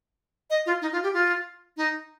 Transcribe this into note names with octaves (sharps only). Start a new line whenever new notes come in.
D#5
F4
D#4
F4
G4
F4
D#4